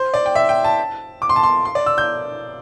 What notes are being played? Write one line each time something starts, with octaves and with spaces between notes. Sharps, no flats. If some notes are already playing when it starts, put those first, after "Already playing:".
Already playing: C5
D5
G5
E5
G5
A5
D6
C6
A5
C6
C6
D5
E6
G6